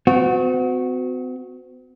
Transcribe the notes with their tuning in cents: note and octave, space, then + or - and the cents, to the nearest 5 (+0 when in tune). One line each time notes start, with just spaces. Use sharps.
C4 -45 F#4 -15